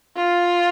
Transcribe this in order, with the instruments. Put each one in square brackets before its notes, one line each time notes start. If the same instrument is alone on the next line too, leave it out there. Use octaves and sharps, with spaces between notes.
[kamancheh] F4